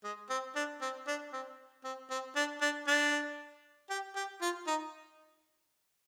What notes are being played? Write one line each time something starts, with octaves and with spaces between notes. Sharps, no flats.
G#3
C4
D4
C4
D4
C4
C4
C4
D4
D4
D4
G4
G4
F4
D#4